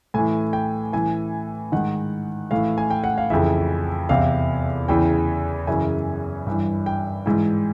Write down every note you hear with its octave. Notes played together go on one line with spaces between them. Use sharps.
A2 E3 G#5
G5
A2 E3 G#5
G#2 D#3 F#5
A2 E3 F5
G#5
G5
F#5
F5
F2 C#3 E3 E5
E2 C3 E3 F5
E2 C#3 E3 G5
F#2 C#3 E3 G#5
G2 E3
G5
G#2 E3